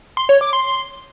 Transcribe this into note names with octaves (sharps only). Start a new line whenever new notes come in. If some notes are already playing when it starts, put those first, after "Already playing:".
C6
C#5
D6
C6